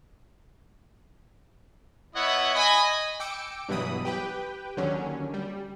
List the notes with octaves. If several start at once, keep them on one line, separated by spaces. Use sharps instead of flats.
B3 E4 C#5 D#5 E5 F#5
D#5 G#5 B5
G5 D6 E6 C#7 D7
G2 B2 E3 F#3 B5 D#6
G4 B4 G5
D#2 D3 F#3 C#4
G3